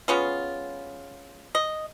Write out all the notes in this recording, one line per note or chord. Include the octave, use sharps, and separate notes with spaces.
G#3 B3 C#4 F4
D#5